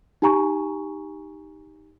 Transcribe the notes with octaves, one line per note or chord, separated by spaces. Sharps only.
D#4 G4 G#5 A#5 C#6